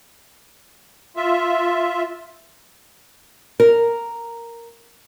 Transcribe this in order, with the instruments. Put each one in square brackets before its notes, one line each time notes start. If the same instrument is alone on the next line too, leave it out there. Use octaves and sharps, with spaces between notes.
[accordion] F4 E5
[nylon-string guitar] A#4